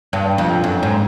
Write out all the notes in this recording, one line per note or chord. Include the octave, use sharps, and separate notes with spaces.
G2
F2
F#2
G#2